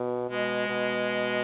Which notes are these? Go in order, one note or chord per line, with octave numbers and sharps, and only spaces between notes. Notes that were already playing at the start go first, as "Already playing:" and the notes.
Already playing: B2
B2 G#3
B2